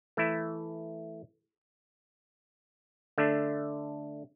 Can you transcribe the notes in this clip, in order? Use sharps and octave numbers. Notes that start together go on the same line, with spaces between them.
E3 A3 E4
D3 A3 D4